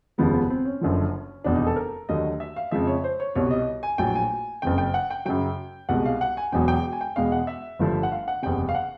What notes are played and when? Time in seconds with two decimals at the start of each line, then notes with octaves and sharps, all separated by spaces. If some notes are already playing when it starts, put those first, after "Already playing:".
0.18 F1 D#2 C#3 F3 G#3 B3
0.34 B3
0.50 C4
0.65 C#4
0.81 F#1 F#2 D3 F3
1.44 F1 E2 B2 D4
1.55 D#4
1.67 A4
1.76 A#4
2.09 D#2 D3 F#3 A3 D#5
2.40 E5
2.56 F5
2.72 F2 C#3 F3 G#3 E5
2.87 C#5
3.04 C5
3.20 C#5
3.35 C2 B2 G3 C#5
3.51 D#5
3.83 G#5
3.98 A#1 A2 F#3 G5
4.15 G#5
4.62 F#1 F2 C#3 G5
4.78 G5
4.94 F#5
5.10 G5
5.25 F#2 C#3 F#3 G5
5.89 C2 B2 G#3 F#5
6.05 F5
6.21 F#5
6.37 G#5
6.52 E1 E2 B2 F#3 G5
6.68 G5
6.92 G#5
7.01 G5
7.16 E2 B2 G#3 F5
7.32 F#5
7.47 E5
7.79 G1 G2 D3 F3 A3
8.03 F#5
8.12 F5
8.28 F#5
8.42 F#1 E2 C3 G5
8.69 F5
8.75 F#5